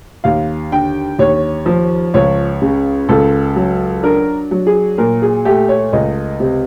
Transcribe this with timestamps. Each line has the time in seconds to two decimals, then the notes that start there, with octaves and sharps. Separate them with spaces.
0.24 D#2 F5
0.71 D3 G5
1.19 D#2 C#5
1.66 F3
2.14 C#2 C#5
2.62 C#3
3.09 C#2 A4
3.56 F#3
4.03 D4 A#4
4.51 F#3
4.67 G#4
4.98 A#2 A#4
5.22 G#4
5.45 A3 G4
5.69 C#5
5.93 C#2 D#5
6.40 C3